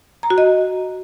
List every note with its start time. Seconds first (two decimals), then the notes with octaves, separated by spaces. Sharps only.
0.23 A#5
0.30 F#4
0.38 D#5